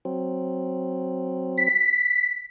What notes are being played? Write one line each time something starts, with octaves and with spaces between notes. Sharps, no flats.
F#3 C4
B6